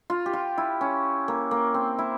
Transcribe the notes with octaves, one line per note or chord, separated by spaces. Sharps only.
F4
G4
F4
E4
C#4
A#3
A#3
C4
E4